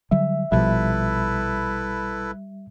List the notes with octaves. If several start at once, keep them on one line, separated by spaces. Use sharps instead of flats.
D3 F#3 G3 E5
A#1 B2 F3 G3 E4 A4 B4 E5